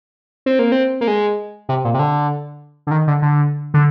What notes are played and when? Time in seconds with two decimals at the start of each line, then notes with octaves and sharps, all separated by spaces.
0.46 C4
0.59 A#3
0.72 C4
1.01 A#3
1.08 G#3
1.69 C3
1.85 A#2
1.94 C3
1.99 D3
2.87 D3
2.91 D#3
3.07 D3
3.22 D3
3.74 D3